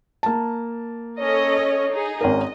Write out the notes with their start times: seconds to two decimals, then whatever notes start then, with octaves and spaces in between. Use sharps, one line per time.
0.23 A#3 A5
1.19 C#4 A4 C#5 D#5
1.91 D#4 G#4
2.21 G#1 C#4 A#4 D#5